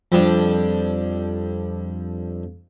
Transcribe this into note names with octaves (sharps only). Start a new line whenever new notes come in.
F2 G3 D4